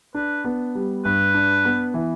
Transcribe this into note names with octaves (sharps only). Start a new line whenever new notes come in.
D4 B4
B3
G3
G2 B4
D4
B3
E3